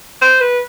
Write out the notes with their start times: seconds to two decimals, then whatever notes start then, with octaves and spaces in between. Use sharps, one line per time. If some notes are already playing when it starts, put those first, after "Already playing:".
0.21 C5
0.41 B4